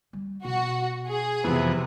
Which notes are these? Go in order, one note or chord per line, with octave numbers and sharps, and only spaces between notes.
G3
B2 F#4
G#4
F2 C3 E3 B3